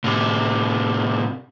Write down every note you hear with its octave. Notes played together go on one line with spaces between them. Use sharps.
A2 C3